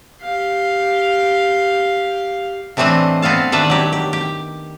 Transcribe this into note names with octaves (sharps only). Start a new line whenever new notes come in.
G4 F5
A2 E3 A3 C4 D4 D#5
B3 C4 A4 F5 A5
D#3 D4 B4 D5 E5 F#5
F#3 G4
G4
G4